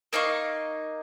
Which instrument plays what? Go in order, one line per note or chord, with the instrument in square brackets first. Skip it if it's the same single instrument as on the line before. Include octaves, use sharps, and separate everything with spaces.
[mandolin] A#3 D#4 F5 C#6